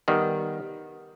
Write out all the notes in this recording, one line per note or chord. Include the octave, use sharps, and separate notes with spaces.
D#3 G3 B3